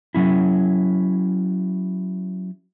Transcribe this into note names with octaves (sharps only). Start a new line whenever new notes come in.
F#3 C#4 E4